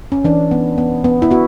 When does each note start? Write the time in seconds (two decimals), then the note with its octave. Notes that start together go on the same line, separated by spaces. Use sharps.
0.12 C#4
0.24 E3 D4
0.51 B3
0.78 B3
1.04 B3
1.22 E4
1.31 B3 F#4